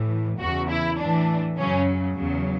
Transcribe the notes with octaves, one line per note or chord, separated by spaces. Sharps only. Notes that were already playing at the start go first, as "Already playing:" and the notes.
Already playing: A2 E3
E2 C#3 E3 F#4
E4
A2 E3 D4
F#2 C#3 F#3 C#4
E2 C#3 F#3